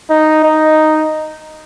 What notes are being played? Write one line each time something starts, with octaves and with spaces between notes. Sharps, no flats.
D#4
D#4